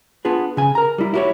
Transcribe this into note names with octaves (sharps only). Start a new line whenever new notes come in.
B3 D4 F4 G#4 B4
C#3 G#5
A#4 A#5
G3 E4
E4 F#4 G4 C5 C#5